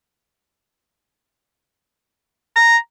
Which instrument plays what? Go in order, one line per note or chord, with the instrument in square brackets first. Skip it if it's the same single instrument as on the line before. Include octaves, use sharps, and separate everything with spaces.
[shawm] A#5